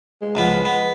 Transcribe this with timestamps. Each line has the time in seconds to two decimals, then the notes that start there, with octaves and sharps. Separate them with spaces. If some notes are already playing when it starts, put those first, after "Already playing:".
0.22 G#3
0.35 C#2 F3 B3
0.65 B3